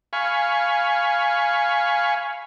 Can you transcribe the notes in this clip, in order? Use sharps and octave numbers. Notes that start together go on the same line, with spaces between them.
F5 G#5 B5 C#6